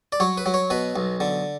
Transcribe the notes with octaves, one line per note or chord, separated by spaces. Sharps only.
D5
F#3 C#5
B4
F#3
C#5
B2 B4
B1
D3